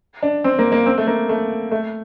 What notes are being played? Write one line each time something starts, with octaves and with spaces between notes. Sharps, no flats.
D4
C4
A#3
A#3
C4
A3
A#3
A3
A3